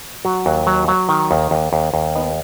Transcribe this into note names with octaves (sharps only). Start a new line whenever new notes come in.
F#3 F#4
D#2
F#3
F#3
D#3
D#2
D#2
D#2
D#2
B3 D#4